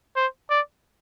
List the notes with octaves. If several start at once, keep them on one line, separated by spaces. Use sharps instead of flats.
C5
D5